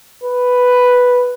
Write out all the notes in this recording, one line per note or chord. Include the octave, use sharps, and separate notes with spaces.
B4